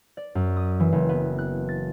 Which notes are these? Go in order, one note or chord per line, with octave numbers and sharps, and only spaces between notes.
D5
F#2
D#6
E3
F#1
B3
F#6
A6